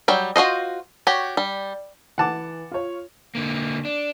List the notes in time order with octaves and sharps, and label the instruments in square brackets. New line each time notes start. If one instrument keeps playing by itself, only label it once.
[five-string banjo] F#3 G3 G5
F4 F#4 C5 D#5
F#4 G4 C#5
G3
[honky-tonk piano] E3 [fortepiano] F#5 A5 D6
[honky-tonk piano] F4 C#5
[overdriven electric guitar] D3 A#3
D4